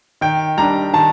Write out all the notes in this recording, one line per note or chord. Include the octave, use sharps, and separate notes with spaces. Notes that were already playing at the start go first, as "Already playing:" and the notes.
D#3 G5
G3 D4 A#5
D#3 A5